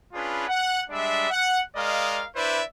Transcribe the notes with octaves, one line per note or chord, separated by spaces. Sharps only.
C#4 D4 F4 G#4 B4
F#5
G3 G#3 D4 D5 E5
F#5
G#3 A#4 D5 D#5 F5
D4 E4 B4 C5 D5 E5